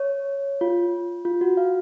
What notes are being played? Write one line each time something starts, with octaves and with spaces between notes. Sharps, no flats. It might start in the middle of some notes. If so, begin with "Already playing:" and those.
Already playing: C#5
F4
F4
F#4
F5